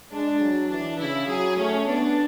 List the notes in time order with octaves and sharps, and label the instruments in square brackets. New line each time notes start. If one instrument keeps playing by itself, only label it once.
[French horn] G#3 [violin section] D4
[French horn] F#3
[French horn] E3 [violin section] D4
[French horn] C#3 [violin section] E4
[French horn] F#3 [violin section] G#4
[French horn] A3 [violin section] C#4
[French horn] B3 [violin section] D4